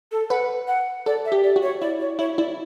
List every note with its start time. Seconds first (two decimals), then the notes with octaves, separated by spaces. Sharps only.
0.12 A4
0.30 B4 F#5
0.68 F#5
1.06 A4 D5
1.25 E5
1.32 G4
1.43 D5
1.56 F#4
1.62 C#5
1.81 E4 D5
2.00 C#5
2.19 E4 C#5
2.38 E4 D5